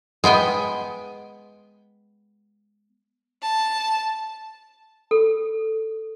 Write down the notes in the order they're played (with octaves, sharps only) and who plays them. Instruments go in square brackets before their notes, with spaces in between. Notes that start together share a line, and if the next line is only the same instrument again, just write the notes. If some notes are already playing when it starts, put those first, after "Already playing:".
[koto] G#3 B3 G5 G#5
[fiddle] A5
[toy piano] A4